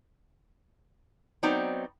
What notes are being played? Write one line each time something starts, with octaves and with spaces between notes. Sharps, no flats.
F#3 B3 C4 D#4 D5 A#5